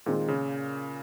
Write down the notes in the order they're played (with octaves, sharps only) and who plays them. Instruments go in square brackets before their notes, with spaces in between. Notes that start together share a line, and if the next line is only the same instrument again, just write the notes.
[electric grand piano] A#2 [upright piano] D#3 G#3 C4 F4
[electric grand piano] C#3